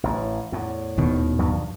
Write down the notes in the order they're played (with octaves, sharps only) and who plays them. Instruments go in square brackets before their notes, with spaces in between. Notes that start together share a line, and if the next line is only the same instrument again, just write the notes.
[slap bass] A1 A2
E2 A2
[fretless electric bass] D#1 B2 D#3
[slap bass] G2 F3 F#3